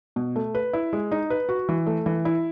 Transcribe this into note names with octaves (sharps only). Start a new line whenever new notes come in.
B2
A3
B4
E4
G#3
D#4
B4
F#4
E3
A3
E3
E4